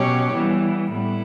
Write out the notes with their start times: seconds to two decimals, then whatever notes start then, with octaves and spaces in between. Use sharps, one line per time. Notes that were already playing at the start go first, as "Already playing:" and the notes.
Already playing: B2 F#3 C#4 G4 C#5
0.33 E3 G3 B3
0.90 A2 G3 B3 E4